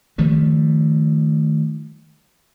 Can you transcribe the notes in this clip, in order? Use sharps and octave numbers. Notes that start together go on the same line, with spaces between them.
D#3 F3 G3 A3